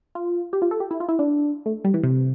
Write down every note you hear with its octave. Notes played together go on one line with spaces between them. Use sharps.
F4
G4
F4
A4
G4
E4
F4
E4
D4
A3
G3
E3
C3